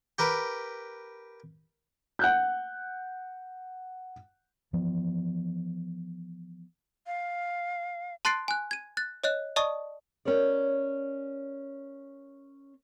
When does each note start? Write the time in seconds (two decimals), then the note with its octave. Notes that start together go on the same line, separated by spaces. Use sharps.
0.19 G4 A#4 B4
2.19 F#5 F#6 G6
4.73 E3 F3 B3
7.07 F5
8.25 A5 C6 F#6 A6 C7 D7
8.48 G#5 F#6
8.71 G#6 D#7
8.97 F#6 A6
9.24 C#5 D#5 F#6
9.56 D5 D#5 A5 C#6 D#6
10.25 C#4 A#4 C#5 D5